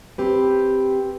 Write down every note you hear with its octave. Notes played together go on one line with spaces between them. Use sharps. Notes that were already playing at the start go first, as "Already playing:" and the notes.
C4 G4 B4